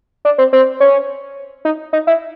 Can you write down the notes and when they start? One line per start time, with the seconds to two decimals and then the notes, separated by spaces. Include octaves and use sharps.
0.25 D4
0.38 C4
0.53 C4
0.80 C#4
1.65 D#4
1.93 D#4
2.07 E4